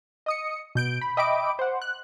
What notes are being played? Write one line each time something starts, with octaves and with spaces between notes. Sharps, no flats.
D#5 D#6 C#7
B2 G6 D7
B5
D#5 E5 G5 B5 D6 D7
C5 F#5
F#6